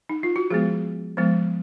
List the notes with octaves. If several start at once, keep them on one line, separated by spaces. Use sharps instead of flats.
D#4
F4
F#4
F3 G#3 B3 G#4
F3 G#3 B3